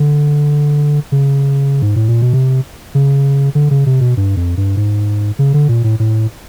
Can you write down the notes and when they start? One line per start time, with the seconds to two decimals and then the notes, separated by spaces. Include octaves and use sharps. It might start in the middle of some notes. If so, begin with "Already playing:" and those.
Already playing: D3
1.12 C#3
1.82 G#2
1.96 A2
2.09 A#2
2.22 B2
2.33 C3
2.95 C#3
3.55 D3
3.71 C#3
3.86 C3
4.01 B2
4.17 G2
4.37 F2
4.57 G2
4.77 G#2
5.39 C#3
5.54 D3
5.69 A#2
5.84 A2
5.99 A2